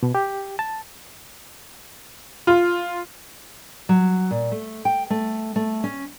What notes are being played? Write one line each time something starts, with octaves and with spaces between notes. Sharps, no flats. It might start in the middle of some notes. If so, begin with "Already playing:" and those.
B2
G4
A5
F4
F#3
A#2
A3
G5
A3
A3
C#4